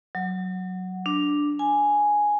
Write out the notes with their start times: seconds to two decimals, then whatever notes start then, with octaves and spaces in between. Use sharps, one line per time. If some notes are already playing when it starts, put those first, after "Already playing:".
0.15 F#3
1.06 D4
1.59 G#5